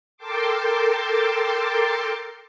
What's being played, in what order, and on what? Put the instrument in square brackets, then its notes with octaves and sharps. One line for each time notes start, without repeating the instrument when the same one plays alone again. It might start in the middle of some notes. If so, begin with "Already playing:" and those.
[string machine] A4 A#4 G5 A5 C6 D6